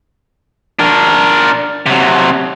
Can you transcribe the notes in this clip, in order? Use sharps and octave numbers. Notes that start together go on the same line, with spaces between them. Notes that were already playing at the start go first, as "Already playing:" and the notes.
D4 A#4
C3 F#3